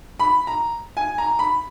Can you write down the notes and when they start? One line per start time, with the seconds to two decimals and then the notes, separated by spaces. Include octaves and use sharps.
0.20 B5
0.47 A#5
0.97 G#5
1.18 A#5
1.39 B5